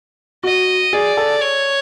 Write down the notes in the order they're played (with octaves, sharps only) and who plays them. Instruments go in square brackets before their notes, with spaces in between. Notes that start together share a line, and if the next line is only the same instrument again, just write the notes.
[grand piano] F#4 [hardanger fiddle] D#5
[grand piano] G#4 [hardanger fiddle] D5
[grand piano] A4
[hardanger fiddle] C#5